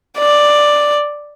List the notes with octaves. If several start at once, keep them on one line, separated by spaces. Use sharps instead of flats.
D5